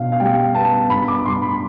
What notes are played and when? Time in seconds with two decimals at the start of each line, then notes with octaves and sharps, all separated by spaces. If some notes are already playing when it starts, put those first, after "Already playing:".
Already playing: B2 D4 F5
0.12 F5
0.20 G3 G5
0.55 B3 A5
0.90 G2 B5
1.08 D6
1.26 G2 C6
1.42 B5